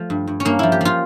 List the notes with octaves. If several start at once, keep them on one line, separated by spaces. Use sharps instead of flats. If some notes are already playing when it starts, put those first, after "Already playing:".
Already playing: F3 A3
G2
G2
C#4
G2 A#3
F3 E4
G4
F3 F4